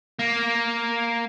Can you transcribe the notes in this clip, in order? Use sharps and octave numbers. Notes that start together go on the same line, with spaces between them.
A#3